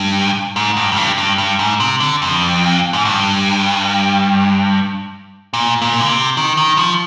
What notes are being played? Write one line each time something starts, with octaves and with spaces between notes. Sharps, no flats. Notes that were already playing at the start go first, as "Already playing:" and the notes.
Already playing: G2
G#2
G2
F2
G2
G2
G2
G#2
C3
D3
F2
G#2
G2
A#2
A#2
D3
C3
D#3
D#3
F3